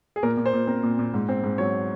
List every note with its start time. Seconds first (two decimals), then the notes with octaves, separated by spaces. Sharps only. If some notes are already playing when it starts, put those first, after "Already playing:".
0.16 G#4
0.23 A#2 A#4
0.37 A#2
0.46 C5
0.53 A#2
0.67 C4 A#4
0.83 A#2
0.99 A#2
1.14 G#2
1.29 C4
1.44 G#2
1.58 F#3 C#5